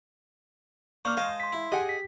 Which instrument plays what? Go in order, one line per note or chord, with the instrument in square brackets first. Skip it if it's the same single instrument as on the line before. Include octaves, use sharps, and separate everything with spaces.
[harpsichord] A#3 D4 C5 [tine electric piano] C#6 F6 [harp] G6
[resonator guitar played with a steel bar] G#3 F5 [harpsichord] C5 D#5 A5
[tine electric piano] C6 B6
[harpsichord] E4
[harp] G4 [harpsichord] G#4 [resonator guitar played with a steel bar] D#5 F#5 G#5
[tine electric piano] B6